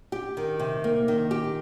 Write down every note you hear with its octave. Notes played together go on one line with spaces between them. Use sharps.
G4
D#3
C3
A#3
D#3
G4